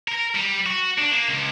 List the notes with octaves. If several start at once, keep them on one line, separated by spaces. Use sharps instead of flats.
A#4
G3
F#4
D4
A#3
C#2